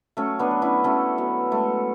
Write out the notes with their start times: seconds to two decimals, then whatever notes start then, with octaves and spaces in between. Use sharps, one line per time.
0.17 F#3 A3 C#4
0.39 B3 D4
0.51 F#3
0.62 C#4 E4
0.84 F#3 A3 C#4
1.18 F#3 B3
1.51 G#3 A3